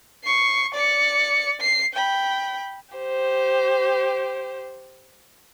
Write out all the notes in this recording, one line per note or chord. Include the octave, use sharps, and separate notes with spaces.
C#6 C7
D5 C#7
C7
G5 B5
G4 C5